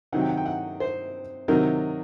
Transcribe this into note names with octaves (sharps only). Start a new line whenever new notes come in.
C3 D#3 F#3 F#5
G5
F#5
G5
F#5
C5
C3 D#3 F#3 A#4